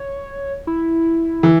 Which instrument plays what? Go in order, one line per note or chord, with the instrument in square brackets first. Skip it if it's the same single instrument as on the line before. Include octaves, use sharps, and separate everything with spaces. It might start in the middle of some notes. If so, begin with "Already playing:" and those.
Already playing: [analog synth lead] C#5
E4
[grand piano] E3